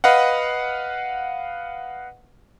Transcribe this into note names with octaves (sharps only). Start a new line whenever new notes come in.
B4 D#5 F5 F#5